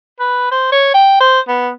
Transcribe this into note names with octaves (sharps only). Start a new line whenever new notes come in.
B4
C5
C#5
G5
C5
B3